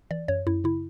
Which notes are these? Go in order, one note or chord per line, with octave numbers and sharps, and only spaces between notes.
E3 D5
F#2 C#5
F#2 E4
C#3 E4